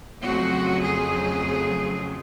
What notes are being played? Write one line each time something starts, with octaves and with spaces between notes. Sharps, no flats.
F2 C#3 F#3 A3 C4 F#4
G#4